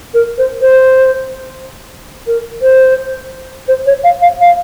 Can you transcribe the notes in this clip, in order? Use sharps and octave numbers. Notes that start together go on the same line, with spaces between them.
A#4
C5
C5
A#4
C5
C5
C#5
F5
F5
F5